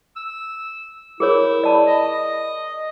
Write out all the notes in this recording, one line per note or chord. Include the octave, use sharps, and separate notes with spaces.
E6
E4 G#4 A#4 C#5
D5 A5 B5
D#5